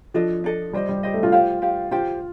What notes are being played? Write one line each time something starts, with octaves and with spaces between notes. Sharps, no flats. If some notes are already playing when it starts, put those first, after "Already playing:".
F3 D4 A4 D#5
D4 A4 D#5
G3 G4 C5 D#5
G3
G4 C5 D#5
A3
F4
G4 C5 F5
G4 C5 F5
F4 G4 C5 G5